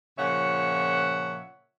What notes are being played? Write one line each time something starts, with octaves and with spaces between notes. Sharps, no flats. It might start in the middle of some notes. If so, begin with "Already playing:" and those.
A#2 C#3 F3 C#5 E5 F#5